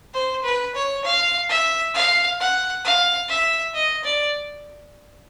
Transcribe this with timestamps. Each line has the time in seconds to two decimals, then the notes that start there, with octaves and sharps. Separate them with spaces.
0.13 C5
0.43 B4
0.75 C#5
1.05 F5
1.49 E5
1.94 F5
2.39 F#5
2.84 F5
3.28 E5
3.74 D#5
4.04 D5